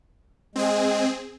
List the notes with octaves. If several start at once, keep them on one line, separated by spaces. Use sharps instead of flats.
G#3 C4 G#4